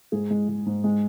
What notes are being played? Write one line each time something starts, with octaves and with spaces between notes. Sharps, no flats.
G#2 G#4
G#3
G#3
G#2
G#3